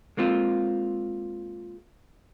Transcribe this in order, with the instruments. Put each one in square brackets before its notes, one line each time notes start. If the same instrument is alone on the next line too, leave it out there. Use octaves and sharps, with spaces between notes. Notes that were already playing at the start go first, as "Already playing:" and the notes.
[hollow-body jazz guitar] G#3 A#3 C4 F4